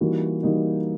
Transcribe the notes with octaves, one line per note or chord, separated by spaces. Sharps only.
E3 G3 A#3 D#4 F#4
E3 G3 A#3 D#4 F#4